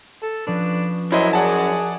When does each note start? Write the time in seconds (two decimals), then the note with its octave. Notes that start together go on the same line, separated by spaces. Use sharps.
0.22 A4
0.47 F3 C#4 D4 B4
1.12 F#2 E4 C5 D#5
1.33 G#4 D5 F#5 A5